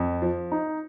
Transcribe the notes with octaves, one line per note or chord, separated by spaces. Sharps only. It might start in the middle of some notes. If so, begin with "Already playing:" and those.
Already playing: F2
F3
D#4